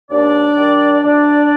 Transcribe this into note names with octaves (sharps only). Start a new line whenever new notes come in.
D#2 D4 D5
D#3 G3
D2 D4 D5